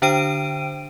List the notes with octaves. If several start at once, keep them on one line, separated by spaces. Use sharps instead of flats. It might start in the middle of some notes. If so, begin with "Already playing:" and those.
D3 D4 C5 G5 D7 D#7